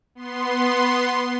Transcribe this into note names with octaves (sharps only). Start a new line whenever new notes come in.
B3 C6